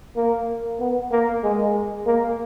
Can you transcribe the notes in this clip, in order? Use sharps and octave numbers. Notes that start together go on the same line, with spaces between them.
A#3
B3
A#3
G#3
A#3